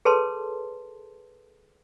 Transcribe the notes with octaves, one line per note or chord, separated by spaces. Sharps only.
G#4 A4 B4 C#5 A5 C6